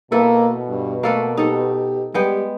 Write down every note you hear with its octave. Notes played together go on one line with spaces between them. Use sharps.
B2 A#3 E4 A4 B4
G2
A3 A#3 A4 B4
D#4 G4 A4
G3 G#3 B3 G5